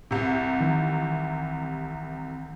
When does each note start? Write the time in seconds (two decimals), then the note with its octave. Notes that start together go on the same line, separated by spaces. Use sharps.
0.11 C2 C3
0.61 D#3 E3